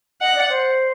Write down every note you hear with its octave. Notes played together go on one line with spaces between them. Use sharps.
D#5 F#5
D5
C5